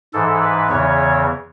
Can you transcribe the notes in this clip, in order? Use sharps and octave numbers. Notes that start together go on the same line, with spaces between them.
G#2 E3 A4
B4
E2 C#3 E3 C#5